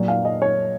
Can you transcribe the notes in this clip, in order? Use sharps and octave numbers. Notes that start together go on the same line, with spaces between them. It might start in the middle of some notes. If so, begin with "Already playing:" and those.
Already playing: A#2 F#3
F5
D#5
C#5